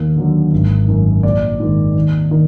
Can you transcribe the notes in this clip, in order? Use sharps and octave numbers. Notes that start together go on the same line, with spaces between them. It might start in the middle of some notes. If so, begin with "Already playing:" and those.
Already playing: D#2
D3 F#3
G#1
F#2 D#3
A#1 D5
G#2 D#3
D#2
D#3